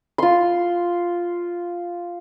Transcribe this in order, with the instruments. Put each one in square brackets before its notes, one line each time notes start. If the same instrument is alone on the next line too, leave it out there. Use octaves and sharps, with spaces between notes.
[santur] F4 C6